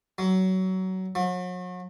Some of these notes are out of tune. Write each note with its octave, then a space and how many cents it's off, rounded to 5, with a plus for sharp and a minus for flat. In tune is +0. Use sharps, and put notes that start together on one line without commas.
F#3 +20
F#3 -40